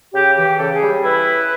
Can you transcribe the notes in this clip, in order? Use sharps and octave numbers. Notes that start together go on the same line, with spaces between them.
C#3 G4
E3 G4
C#3 A4
G#4
G3
E4 B4